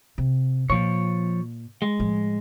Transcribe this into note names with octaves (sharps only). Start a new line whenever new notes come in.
C3
A#2 F3 C#5
G#3
A2 F3